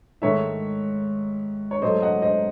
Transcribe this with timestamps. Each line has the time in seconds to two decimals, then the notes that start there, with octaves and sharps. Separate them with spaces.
0.22 G#2 D#3 A3 C#5 E5
1.71 C#5
1.82 G#2 F#3 A3 C5 D#5
2.02 D#5 F#5
2.22 C5 D#5